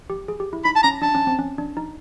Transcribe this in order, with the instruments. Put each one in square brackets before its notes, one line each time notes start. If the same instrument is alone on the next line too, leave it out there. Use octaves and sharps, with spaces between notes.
[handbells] G4
G#4
G4
E4
[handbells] D#4 [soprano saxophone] B5
[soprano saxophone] A5
[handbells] C#4 [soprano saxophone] A#5
[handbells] D4 [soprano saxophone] A5
[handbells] C#4
C4
C#4
D4
D#4